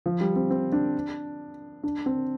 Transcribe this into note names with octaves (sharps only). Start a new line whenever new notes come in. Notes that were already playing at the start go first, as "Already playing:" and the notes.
F3
G3
C4
C4
D4
D4
C4